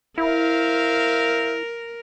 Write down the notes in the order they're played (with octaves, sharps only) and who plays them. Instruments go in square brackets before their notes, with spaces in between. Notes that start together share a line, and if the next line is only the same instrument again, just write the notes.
[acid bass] E4 [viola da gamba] A#4 [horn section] C5 E5 F5